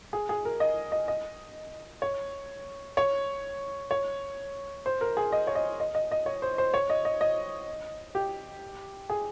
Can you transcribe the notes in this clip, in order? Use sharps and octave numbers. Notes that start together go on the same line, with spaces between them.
G#4
G#4
A#4
D#5
D#5
D#5
C#5
C#5
C#5
C5
A#4
G#4
D#5
C#5
D#5
D#5
D#5
D#5
C#5
C5
C5
C#5
D#5
D#5
D#5
G4
G#4